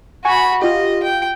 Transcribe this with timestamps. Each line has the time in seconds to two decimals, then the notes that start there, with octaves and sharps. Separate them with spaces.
0.25 F#4 F#5 G#5 B5 C#6
0.62 F4 G4 D#5
1.03 G5